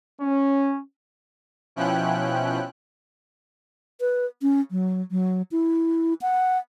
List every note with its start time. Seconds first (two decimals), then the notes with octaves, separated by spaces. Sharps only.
0.21 C#4
1.76 B2 F3 C#4 E4 G5 F#6
4.01 B4
4.42 C#4
4.71 F#3
5.11 F#3
5.52 E4
6.22 F#5